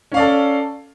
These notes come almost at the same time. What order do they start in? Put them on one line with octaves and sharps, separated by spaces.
C#4 F5 D5 A4